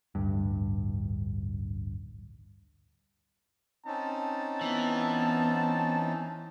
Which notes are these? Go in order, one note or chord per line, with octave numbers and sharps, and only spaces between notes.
A1 D2 G2
C4 C#4 D#4 A5
E3 B3